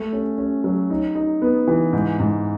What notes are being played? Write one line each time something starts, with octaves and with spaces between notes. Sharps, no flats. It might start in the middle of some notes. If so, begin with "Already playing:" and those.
Already playing: A3
C#4
C#4
F#3
D#4
D#4
B3
E3
G#2
G#2